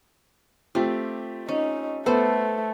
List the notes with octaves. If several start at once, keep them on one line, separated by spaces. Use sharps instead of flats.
A3 C4 F4 G4
C#4 D#4
A3 B3 A4 C5